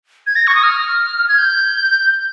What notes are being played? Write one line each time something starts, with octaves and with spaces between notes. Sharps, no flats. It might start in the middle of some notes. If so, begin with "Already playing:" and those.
G#6
A#6
C#6
D#6
F6
G#6
G6